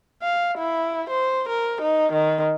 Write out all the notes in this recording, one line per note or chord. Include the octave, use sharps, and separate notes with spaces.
F5
E4
C5
A#4
D#4
D#3